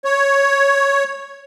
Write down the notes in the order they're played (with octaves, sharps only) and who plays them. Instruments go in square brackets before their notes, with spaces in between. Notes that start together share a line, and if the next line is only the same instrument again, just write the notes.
[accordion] C#5